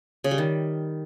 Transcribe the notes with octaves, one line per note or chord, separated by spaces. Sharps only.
C#3
G3
D#3